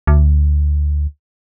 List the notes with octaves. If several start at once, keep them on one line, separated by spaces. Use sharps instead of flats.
D2